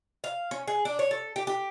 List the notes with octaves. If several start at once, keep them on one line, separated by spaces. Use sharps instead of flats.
F5
C#4
G#4
D4
C#5
A4
G4
G4